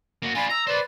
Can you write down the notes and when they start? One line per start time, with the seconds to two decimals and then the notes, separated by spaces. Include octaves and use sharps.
0.22 A#3 F#4
0.35 D4 F4 G#5 B5
0.49 A#5 E6
0.67 B4 C5 D5 B5